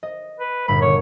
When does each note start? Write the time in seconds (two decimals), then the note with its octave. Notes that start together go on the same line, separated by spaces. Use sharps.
0.03 D#5
0.40 B4
0.68 G1 A#2 B5
0.82 D3 C#5